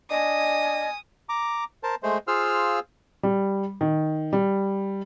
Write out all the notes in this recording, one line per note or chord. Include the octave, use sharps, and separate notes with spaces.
D4 D#5 G#5 D#6
A#5 D6
A#4 C5 A5
G#3 A3 C5
F4 G#4 C5 F5 E6 F6
G3
D#3
G3